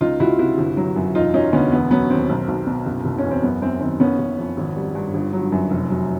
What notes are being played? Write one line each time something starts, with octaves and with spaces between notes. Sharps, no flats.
C#2 D#4 F4
C#2 E4 F#4
C3 E4 F#4
G1
F#3
F#2
E1 D#4 F4
F#3 C#4 D#4
D2 B3 C#4
E1 B3
F#3 B3 C#4
D#2 C4
B1
B1
B2
F#1
F#1
C#4
E2
C4
F#2 B3
F#2 C4
D#3 C4
F#1 B3 C#4
F#1
F2
G#1
G3
G2
G1
F#3
F#2
F1
F#3